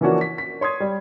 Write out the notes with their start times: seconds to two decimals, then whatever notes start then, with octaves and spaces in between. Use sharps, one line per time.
0.01 E3 F3 A#3 C#4 D4 F#4
0.21 B6
0.38 B6
0.61 C#5 C6 D#6 G#6
0.80 G3